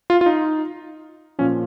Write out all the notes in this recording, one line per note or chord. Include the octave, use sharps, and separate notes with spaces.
F4
F4
D#4
A#2 F3 C#4